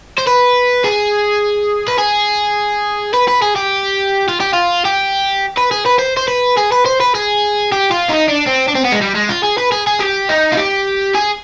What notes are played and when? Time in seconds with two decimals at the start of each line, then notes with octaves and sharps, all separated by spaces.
0.18 C5
0.27 B4
0.84 G#4
1.88 B4
1.99 G#4
3.14 B4
3.28 B4
3.42 G#4
3.56 G4
4.29 F4
4.40 G4
4.53 F4
4.85 G4
5.57 B4
5.71 G#4
5.86 B4
5.99 C5
6.17 C5
6.28 B4
6.57 G#4
6.72 B4
6.86 C5
7.00 B4
7.15 G#4
7.72 G4
7.91 F4
8.10 D#4
8.29 D4
8.47 C4
8.68 D4
8.75 C4
8.85 B3
8.92 G#3
9.01 G3
9.15 G#3
9.29 F4
9.43 G#4
9.58 B4
9.72 G#4
9.87 G#4
10.00 G4
10.29 D#4
10.52 F4
10.57 G4
11.15 G#4